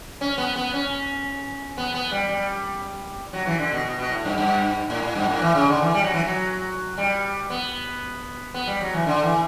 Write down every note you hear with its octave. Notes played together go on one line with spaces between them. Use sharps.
C#4
B3
B3
C#4
B3
B3
G3
G3
F#3
E3
D3
B2
B2
B2
A2
G2
G2
A2
A2
G2
A2
E3
C#3
D3
E3
G3
F#3
E3
F#3
G3
B3
B3
G3
F#3
E3
D3
E3